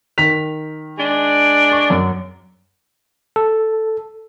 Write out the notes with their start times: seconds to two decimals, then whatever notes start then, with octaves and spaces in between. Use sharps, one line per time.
0.18 D#3 B6 F7
0.97 G#3 D4
1.72 C#6
1.90 F#2
3.36 A4